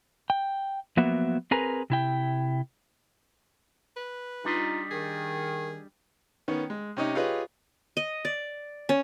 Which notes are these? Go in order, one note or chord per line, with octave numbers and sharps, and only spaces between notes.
G5
F3 F#3 A#3 B3 F#4 E5
C4 G#4 A#4 B4 G#5 A#5
C3 E4 G5
B4
G3 D4 D#4 F4 D#5
D#3 G#4
D#3 B3 C#4
G#3
C3 C#4 D#4
F4 G4 G#4 B4 C#5 D#5
D#5
D5
C#4